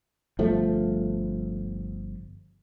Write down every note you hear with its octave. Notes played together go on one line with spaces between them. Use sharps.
G1 F3 A3